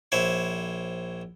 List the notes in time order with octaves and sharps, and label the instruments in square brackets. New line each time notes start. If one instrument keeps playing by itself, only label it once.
[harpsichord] A#1 E4 C5 C#5